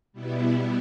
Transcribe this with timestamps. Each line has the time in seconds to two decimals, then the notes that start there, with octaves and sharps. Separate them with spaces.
0.12 B2 G3 B3 E4